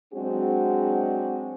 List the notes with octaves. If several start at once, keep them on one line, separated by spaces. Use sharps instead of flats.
F#3 G#3 C4 D4 F#4 G#4